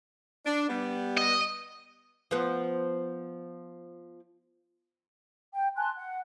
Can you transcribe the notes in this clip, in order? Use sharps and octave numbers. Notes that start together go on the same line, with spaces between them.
D4
G3 B3
D#5
F3 B3
G5
G#5 A5 C6 F#6
F#5